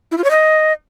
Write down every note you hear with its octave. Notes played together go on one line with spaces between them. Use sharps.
E4
F4
C#5
D#5